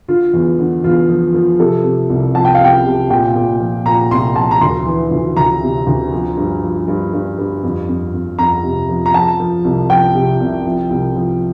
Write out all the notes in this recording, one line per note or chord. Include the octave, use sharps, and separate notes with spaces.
D3 F4
E2
D3
E2 F4
F3
F3
C3 A4
C3
C2
F3 A5
G5
F5
C2 G5
C3
A#2 G5
A#2
F3
A#2 A#5
C2 C6
F3 A5
A#5
D2 C6
E3
D2
D2 A#5
C3
D2
F3
G2
F3
G2
G2
G2
F2
F2
F2
F2 A#5
C3
F3
A#5
F3 A5
F3
C2
F3 G5
C3
C2
F3
C2
F3